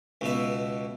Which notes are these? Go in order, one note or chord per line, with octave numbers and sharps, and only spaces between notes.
C#2 B2 E5